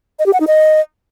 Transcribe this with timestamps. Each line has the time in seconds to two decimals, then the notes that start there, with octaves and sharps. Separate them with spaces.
0.19 D#5
0.26 G4
0.33 F#5
0.40 D#4
0.47 D#5